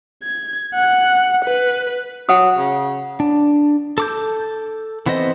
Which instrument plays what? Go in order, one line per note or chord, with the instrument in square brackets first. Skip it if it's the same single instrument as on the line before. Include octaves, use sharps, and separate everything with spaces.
[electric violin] G#6
F#5
B4
[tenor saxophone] F#3 [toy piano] F#5 D#6
[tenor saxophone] C#3
[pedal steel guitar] D4
A4 D6 G6
E3 B3 C4 C5 D#5